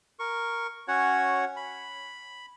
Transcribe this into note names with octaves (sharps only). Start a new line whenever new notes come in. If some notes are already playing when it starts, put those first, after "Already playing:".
A#4 C#6
C#4 F#4 C#5 F#5
B5